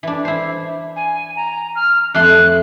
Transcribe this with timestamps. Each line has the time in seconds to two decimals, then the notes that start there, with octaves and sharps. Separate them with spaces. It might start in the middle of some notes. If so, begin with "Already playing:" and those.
0.03 E3 D4
0.25 E4 C5
0.96 G#5
1.36 A#5
1.76 F6
2.14 F2 A3 C6 F#6